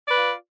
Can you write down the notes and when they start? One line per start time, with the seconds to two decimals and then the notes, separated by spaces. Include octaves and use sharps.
0.07 D5
0.11 B4
0.15 F4